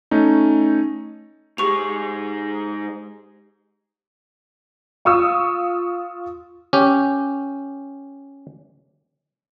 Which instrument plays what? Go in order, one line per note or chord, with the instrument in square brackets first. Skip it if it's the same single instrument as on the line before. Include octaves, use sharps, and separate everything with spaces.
[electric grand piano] A3 C#4 D#4
[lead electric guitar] G#2 G#3 [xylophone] G4 C#6 F7
[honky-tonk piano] F4 C#6 D#6 E6
[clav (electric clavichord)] C#4 G4